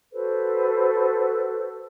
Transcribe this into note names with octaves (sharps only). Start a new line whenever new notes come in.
F#4 A4 B4 C5